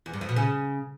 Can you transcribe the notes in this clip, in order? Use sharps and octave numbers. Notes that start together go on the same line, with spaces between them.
E2
G2
F2
B2
C#3